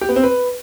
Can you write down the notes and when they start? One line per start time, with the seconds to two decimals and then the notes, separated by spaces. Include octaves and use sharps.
0.01 G4
0.09 B3
0.16 C4
0.23 B4